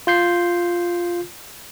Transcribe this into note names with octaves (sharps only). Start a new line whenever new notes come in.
F4 G6 C7